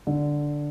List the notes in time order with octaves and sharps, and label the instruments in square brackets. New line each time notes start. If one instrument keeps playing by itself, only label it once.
[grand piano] D3